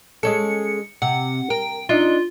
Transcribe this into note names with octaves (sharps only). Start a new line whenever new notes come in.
G#3 C#4 A4 C#7
C3 F#5
A#4 G5
D4 D#4 F4 E5